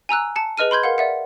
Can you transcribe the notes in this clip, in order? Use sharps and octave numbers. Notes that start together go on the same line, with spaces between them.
G#5 A#5 E6 F#6
A5 C#7
G#4 B4 D#5 F6 D#7
B5 C6 G6 G#6
A#4 F5 F#5
D5 E5 F#5